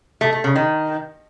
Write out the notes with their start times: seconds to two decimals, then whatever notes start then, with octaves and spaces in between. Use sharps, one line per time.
0.21 A3
0.33 A3
0.44 C#3
0.56 D#3